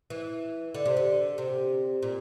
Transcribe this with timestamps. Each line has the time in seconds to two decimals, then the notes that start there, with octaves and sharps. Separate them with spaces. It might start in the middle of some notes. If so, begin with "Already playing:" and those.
0.10 E3
0.74 D3
0.85 C3
0.97 D3
1.38 C3
2.02 A#2